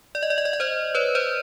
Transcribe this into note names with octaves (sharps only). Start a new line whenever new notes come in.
D5
D#5
D5
D#5
D5
D#5
C5 D5
B4 C#5
C5 D5